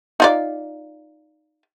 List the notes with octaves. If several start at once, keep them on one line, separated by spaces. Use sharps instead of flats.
D#4 F4 D5